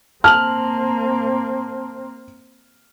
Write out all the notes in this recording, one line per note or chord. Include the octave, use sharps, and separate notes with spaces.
A#3 C4 A5 F6 F#7